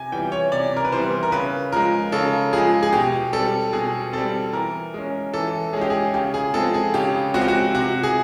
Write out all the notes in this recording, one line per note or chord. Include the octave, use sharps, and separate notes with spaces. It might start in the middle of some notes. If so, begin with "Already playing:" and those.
Already playing: C3 G#5
E3 G3 B3 G5
C#5
C3 D5
A#4
B4
E3 G3 B3 C5
A#4
C#3 B4
F3 G#3 A#4
C#3 A4
F3 G#3 G#4
G#4
B2 G4
G3 C4 A4
B2 G#4
G3 C4 A4
E3 A#4
G#3 C#4
E3 A4
G#3 C#4 G#4
G4
G#4
C#3 G4
G#4
F3 G#3 C4 A4
G#4
C#3 G4
F3 G#3 C4 F#4
G4
F#4
C3 F#4
G#4